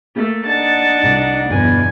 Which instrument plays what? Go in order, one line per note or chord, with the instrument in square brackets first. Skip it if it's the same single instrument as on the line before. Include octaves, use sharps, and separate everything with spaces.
[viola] A3 [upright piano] A#3
[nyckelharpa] D4 [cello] D#4 F#5 [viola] A5
[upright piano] C2
[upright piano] G1 [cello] E2 B2 [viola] G#5